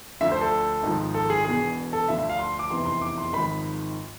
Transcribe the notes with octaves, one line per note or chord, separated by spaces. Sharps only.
D2 D3 F3 E5
C5
A4
G#1 G#2 F3
A4
G#4
E1 E2 B2 G#4
A4
D2 D3 F3 E5
E5
F5
C6
D6
F1 E2 C3 E3 C6
C6
D6
C6
G#1 G#2 F3 B5